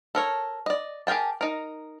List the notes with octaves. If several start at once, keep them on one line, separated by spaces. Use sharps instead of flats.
A4 A#4 C#5
D5 D#5
G4 G#4 A#4 G5 A5
D#4 A#4